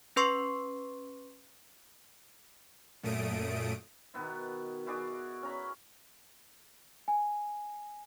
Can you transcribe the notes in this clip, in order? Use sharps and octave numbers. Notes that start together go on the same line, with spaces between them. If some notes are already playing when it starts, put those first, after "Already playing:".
C#4 B4 C6 C#6 C7
F#2 A#2 A3 D#6 D7
B2 D#3 B3 E4
E4 F#4 G#4 D5
C#4 A#5 B5
G#5